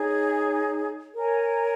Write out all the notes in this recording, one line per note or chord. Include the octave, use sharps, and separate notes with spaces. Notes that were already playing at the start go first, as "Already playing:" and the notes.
Already playing: D#4 G#4 C#5
A#4 C#5 G#5